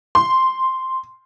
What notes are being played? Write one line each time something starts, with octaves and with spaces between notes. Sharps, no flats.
C6